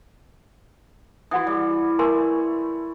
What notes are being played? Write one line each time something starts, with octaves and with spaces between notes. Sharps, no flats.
E3 F#4 F#5 D#6
G3
A3 A#4 G#5 C6